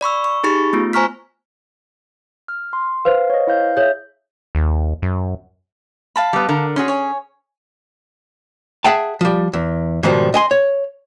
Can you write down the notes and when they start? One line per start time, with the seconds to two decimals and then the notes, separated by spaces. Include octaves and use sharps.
0.01 D5 B5 C#6 E6
0.24 C#6
0.44 D#4 G4 G#4 B5 C#6 A6
0.73 A3 B3 F4
0.93 C5 G#5 A#5 C#6 F6 B6
2.48 F6
2.73 C6
3.05 B4 C5 F5
3.30 C#5 D#5
3.47 E4 F5 G6
3.77 G#4 C#5 E5 G6
4.55 D#2
5.02 F#2
6.16 F5 A5 B5
6.33 G3 B3
6.49 D3 A#4
6.76 C#4 F#4 G#4 C#5 C6
6.88 C#5 G#5
8.84 G#4 E5 F#5 G5 A5
9.21 F3 G3
9.53 E2
10.03 G#2 B2 D#3 F3 G3
10.34 D#5 G#5 C6
10.51 C#5